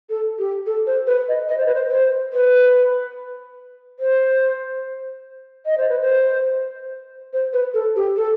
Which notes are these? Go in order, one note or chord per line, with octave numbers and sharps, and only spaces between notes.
A4
G4
A4
C5
B4
D#5
D#5
C5
B4
C5
C5
B4
C5
D#5
C5
B4
C5
C5
B4
A4
G4
A4